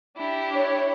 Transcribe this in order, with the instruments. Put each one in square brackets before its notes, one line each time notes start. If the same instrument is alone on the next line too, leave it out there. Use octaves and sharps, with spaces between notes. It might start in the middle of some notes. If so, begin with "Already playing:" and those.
[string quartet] D4 E4 G4
[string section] C#5